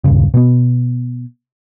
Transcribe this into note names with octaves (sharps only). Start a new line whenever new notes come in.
D#1 C2 G2 C#3
B2 B3